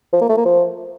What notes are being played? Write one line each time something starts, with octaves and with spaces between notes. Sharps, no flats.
F3
A#3
A3
A#3
F3